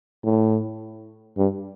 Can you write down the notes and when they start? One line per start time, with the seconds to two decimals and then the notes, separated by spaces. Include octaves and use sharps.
0.24 A2
1.38 G2